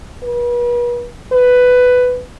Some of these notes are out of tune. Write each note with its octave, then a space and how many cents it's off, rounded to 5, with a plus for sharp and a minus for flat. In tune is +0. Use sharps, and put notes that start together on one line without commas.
B4 -40
B4 +10